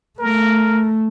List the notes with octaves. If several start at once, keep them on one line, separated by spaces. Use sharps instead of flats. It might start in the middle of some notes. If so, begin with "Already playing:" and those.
A3 A#4